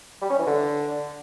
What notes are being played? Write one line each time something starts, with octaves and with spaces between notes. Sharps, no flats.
G3
C#4
E3
D3